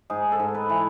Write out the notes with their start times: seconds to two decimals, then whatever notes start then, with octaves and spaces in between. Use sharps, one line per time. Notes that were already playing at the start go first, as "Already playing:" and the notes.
0.10 G#2 G#4
0.32 A4
0.39 G#2
0.54 B4
0.70 E3